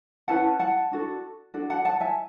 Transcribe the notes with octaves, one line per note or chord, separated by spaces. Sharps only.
C#4 E4 B4 F#5 A5
F#5 A5
D4 F#4 A4
D4 F#4 A4
F#5 A5
F#5 A5
E5 G#5